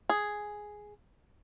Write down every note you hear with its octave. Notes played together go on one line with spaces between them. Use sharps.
G#4